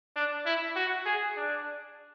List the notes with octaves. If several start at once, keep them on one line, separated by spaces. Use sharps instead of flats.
D4
E4
F#4
G#4
D4